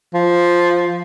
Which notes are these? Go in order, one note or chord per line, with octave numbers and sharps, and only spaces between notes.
F3